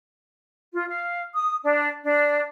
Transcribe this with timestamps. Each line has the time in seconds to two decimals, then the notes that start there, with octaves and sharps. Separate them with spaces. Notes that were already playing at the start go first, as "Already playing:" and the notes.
0.73 F4
0.89 F5
1.34 D#6
1.63 D4
2.04 D4